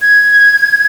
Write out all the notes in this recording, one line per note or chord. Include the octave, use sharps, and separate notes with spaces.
G#6